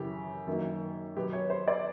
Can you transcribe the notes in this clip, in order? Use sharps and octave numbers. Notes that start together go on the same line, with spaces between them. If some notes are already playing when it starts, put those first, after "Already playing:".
Already playing: F#2 C#3 E3 G4
F#2 D#3 F#3 A#3
B2 F#3 B3 G4
C#5
C5
D5